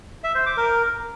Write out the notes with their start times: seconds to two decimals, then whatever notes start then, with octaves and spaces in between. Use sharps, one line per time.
0.24 E5
0.35 C5
0.46 D6
0.57 A#4